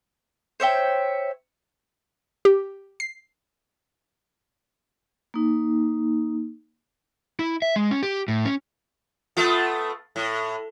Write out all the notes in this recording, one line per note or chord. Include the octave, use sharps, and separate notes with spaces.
C5 C#5 E5 G5
G4
C7
A#3 D#4
E4
E5
G#3
C#4
G4
A2
C#4
A3 B3 F4
A2